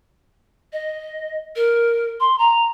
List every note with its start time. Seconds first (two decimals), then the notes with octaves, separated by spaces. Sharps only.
0.73 D#5
1.56 A#4
2.20 C6
2.39 A#5